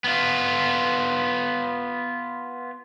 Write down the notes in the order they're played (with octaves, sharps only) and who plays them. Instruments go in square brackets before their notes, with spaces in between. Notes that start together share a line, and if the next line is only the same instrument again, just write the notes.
[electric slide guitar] B3 F4